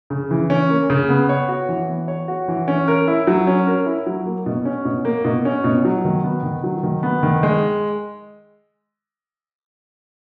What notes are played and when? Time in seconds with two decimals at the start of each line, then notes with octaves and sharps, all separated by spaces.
0.10 C#3
0.31 E3
0.50 C#4
0.70 A#3
0.90 C#3
1.09 B3
1.29 C#5
1.49 F#4
1.69 E3
1.88 B3
2.08 C#5
2.28 F#4
2.48 E3
2.68 C#4
2.88 A#4
3.08 E4
3.27 F#3
3.47 C#4
3.67 A#4
3.86 E4
4.06 F#3
4.25 A#3
4.46 B2
4.65 C#4
4.85 B2
5.05 A#3
5.25 B2
5.45 C#4
5.64 B2
5.85 F#3
6.05 D#3
6.24 B3
6.43 D#3
6.64 F#3
6.83 D#3
7.03 B3
7.23 D#3
7.43 G#3